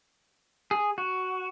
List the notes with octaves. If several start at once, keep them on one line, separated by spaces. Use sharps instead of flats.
G#4
F#4